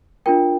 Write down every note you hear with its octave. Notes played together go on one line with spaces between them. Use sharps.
D4 F4 A#4 G5